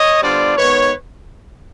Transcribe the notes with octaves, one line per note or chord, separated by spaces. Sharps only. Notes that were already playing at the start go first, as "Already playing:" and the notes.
Already playing: C#5 D#5
D3 G3 B3 D4 F4 C5 D5
G#2 D#3 G#3 B3 B4 C#5